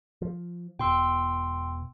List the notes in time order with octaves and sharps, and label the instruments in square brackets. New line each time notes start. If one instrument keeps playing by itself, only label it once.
[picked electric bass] F3
[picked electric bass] E1 B2 [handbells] G5 C6 E6